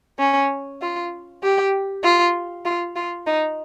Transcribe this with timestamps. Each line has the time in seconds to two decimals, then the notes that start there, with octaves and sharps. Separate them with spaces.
0.19 C#4
0.82 F4
1.43 G4
2.04 F4
2.65 F4
2.96 F4
3.27 D#4